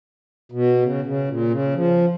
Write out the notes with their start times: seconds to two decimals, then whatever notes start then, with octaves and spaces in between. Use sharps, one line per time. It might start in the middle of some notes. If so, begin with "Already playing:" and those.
0.52 B2
0.82 C#3
1.05 C#3
1.28 A#2
1.50 C#3
1.74 F3